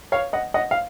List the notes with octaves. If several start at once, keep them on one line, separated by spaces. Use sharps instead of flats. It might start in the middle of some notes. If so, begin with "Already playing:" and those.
C#5 F5
D#5 F#5
D#5 F#5
F5